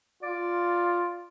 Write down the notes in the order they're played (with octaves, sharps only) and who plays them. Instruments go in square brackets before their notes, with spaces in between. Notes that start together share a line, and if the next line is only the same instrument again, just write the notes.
[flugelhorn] F4 [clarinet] D5